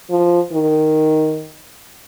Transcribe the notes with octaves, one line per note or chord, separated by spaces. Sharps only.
F3
D#3